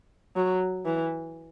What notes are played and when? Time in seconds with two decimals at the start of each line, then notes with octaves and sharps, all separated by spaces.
0.36 F#3
0.86 E3